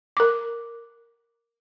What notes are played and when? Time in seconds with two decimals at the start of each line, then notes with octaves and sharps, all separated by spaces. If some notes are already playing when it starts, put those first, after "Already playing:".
0.17 A#4 D6